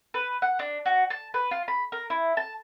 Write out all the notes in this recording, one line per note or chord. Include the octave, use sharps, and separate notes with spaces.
B4
F#5
D4
F#4
A5
B4
F4
B5
A#4
E4
A5